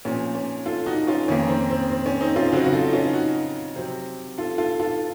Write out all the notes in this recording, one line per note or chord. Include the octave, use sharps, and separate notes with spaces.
A#2 F3 C4 C#4
C#4
F4 A4
D#4 F#4
C#4 F4
F2 D#3 A#3 C#4
C4
C4
C4
C#4
C4 D#4
C#4 F4
C#3 F#3 C4 D#4 F#4
F#4
F4 A4
D#4
C#4 F4
D#4 F#4
C3 F#3 C4
F4 A4
F4 A4
F4 A4